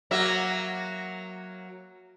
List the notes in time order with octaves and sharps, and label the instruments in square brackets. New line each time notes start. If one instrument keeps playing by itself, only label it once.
[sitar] F#3 A#3 E5